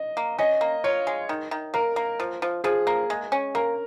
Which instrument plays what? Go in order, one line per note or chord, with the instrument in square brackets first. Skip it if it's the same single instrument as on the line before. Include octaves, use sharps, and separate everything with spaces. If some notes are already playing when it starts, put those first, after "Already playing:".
Already playing: [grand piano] D#5
[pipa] A#3
[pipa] C#4 [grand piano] D#5
[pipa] A#3
[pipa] F4 [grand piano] C#5
[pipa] G#3
D#3
D#3
[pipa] A#3 [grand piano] A#4
[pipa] A#3
F3
F3
[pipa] F3 [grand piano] G#4
[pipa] A#3
G#3
C#4
[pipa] A#3 [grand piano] A#4